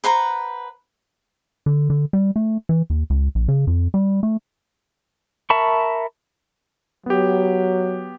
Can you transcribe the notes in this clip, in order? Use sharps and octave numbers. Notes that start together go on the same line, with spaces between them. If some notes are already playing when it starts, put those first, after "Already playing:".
B4 C5 F#5 A#5
D3
D3
G3
A3
E3
D#2
C#2
A#1
C#3
F2
G3
A3
A#4 E5 A5 B5 C#6
F#3 B3 G4